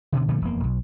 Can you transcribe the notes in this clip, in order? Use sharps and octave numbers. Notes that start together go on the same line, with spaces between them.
D2 B2 D3
A#2 D3 F3 A3
E1 F2 A#3
B1